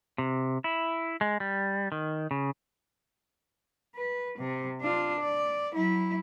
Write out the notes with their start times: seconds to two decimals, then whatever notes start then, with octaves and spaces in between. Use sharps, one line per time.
0.18 C3
0.64 E4
1.21 G#3
1.40 G3
1.92 D#3
2.31 C#3
3.96 B4
4.38 C3
4.82 D4 F4
5.21 D5
5.74 F#3 E4